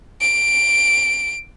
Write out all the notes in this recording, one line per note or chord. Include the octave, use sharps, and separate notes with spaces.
D7